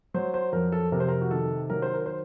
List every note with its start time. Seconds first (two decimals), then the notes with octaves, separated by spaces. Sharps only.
0.14 F#3 C5
0.34 C5
0.53 F2 A#4
0.72 A4
0.92 C3 A#4
1.00 C5
1.08 A#4
1.21 F#4
1.31 D#3 A4
1.70 F#3 A#4
1.82 C5
1.94 A#4
2.06 C5